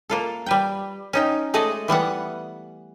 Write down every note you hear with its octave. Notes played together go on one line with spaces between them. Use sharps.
A#3 F4 A4
G3 B4 G5
C#4 D#4 G5
G#3 A3 A4 D5 D#5
E3 G3 B3 F#5